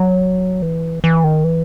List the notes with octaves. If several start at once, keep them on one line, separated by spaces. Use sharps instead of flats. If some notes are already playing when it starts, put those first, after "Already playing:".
Already playing: F#3
E3
E3
D#3
E3